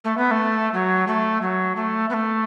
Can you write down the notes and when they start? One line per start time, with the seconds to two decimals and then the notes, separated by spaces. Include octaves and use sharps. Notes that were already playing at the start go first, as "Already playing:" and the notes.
0.04 A3
0.17 B3
0.31 A3
0.73 F#3
1.07 A3
1.42 F#3
1.76 A3
2.10 B3
2.14 A3